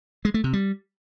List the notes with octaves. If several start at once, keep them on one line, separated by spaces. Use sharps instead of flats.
G#3
A3
C3
G3